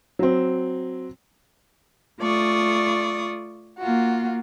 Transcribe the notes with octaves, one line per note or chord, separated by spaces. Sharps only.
F#3 C4
A3 F4 D5 C#6 D#6
A#3 F4 F#4